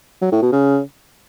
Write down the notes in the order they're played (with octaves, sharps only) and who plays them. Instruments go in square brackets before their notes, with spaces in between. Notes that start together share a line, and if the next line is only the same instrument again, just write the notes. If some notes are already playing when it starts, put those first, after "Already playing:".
[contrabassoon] F#3
A2
B2
C#3